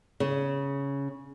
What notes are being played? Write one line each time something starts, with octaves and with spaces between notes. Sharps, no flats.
C#3